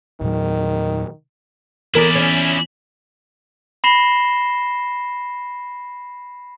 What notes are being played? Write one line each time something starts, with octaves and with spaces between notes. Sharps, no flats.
E2 A#2 D#3 F#3
E3 B3 E4 A#4 D5 B6
C#4
B5 A#6 C7 E7 G7